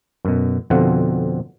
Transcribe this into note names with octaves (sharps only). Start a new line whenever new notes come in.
F#2 B2
F2 B2 D3 C4 F5 F#5